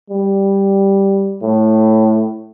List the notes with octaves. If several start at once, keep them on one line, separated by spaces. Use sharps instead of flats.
G3
A2